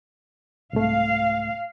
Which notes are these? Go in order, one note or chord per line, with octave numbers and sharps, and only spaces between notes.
C2 G#2 A3 F5